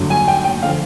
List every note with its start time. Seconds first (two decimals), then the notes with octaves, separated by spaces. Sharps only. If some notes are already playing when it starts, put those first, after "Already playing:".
Already playing: G2 D3 F#3
0.10 G#5
0.28 G5
0.44 G5
0.63 D3 F3 F5